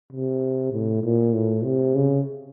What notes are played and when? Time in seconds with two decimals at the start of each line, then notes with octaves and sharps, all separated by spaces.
0.13 C3
0.73 A2
1.04 A#2
1.34 A2
1.65 C3
1.95 C#3